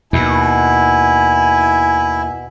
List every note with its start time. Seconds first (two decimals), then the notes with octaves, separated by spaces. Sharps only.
0.13 D#2 B2 E4 G#5